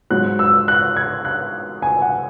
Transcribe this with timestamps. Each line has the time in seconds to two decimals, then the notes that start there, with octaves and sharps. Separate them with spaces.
0.10 G#2 F#3 F#6
0.39 E6
0.68 F#6
0.96 G#6
1.25 F#6
1.82 G#5
2.02 F#5